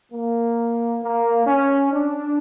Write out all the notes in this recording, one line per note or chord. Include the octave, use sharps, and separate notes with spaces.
A#3
A#3
C#4
D4